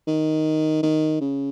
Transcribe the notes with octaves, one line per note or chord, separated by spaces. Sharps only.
D#3
D#3
C#3